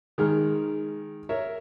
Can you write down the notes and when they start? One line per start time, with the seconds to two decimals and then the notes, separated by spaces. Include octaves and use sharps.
0.18 D#3 G#3 F6
1.29 A#4 C#5 E5